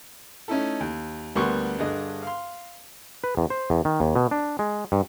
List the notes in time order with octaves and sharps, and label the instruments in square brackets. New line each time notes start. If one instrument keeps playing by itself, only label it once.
[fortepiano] A3 C#4 D#4 E4 A4
D#2
D2 G3 A#3 B3 C6 C#6
G2 D3 G#4 D#5
F5 C6
[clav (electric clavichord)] B4
E2
C5
E2
D#3
D#2
B2
D4
G#3
G2